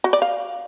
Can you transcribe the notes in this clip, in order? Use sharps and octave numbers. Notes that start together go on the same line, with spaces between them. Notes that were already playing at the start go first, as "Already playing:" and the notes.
F#4
D5
F5